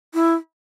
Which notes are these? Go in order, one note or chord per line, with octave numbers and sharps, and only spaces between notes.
E4